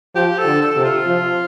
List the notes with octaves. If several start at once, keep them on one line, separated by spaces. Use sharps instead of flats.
F3 G4
A4
D3
A4
C3
F4
F3